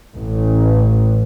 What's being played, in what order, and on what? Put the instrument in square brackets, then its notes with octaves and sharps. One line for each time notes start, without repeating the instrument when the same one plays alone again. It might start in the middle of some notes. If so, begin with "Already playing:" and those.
[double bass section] A1